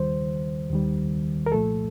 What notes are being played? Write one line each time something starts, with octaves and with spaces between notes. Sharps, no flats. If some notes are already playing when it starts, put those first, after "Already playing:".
Already playing: D#2 D#3 G3 C5
D#2 D#3 G3
A#4
C2 A#2 F3 A3 A4